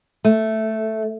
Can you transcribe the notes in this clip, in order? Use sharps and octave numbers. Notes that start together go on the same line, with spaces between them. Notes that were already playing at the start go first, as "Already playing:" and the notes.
A3